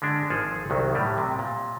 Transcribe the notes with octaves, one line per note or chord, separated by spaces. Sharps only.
D3 G#3 D4
G#1 F3 G#4 A4
C2 D#3 F#3
A2 F#3 G3
C3
A#2